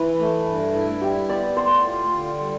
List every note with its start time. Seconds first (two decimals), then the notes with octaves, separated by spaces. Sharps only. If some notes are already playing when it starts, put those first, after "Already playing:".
Already playing: E3 B4
0.19 A3
0.46 G2
0.74 E4
1.01 G3 G4
1.29 B3 D5
1.57 A2 C5
1.84 F4
2.12 D3
2.39 G3